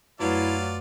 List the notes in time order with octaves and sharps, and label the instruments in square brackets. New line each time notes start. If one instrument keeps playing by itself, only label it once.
[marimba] F#2 A3 B4 [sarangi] F#3 [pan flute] E4 [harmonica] F4 D5 F5